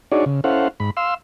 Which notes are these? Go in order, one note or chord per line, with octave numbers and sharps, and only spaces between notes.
D4 D#4 F#4 G#4 C#5 D5
C#3
C#4 E4 A4 C5 F5 F#5
G#2 B5
F5 C6 E6